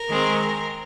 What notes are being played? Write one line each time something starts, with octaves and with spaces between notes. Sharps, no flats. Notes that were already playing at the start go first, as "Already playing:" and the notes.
Already playing: A#4
D#3 G#3 C4